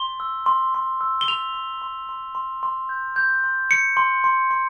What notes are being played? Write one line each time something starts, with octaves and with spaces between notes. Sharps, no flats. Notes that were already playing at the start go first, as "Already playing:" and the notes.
Already playing: C6 G7
E6
C6
C6
E6
G7
C6 F7
C6
C6
C6
C6
C6
G6
G6
C6
G6 C#7
C6
C6
C6